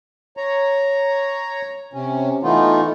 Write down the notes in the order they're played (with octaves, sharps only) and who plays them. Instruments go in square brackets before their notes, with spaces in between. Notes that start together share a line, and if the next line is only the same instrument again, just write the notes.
[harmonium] C#5 A#5
C3 C#4
E3 A3 B3 D#4 F4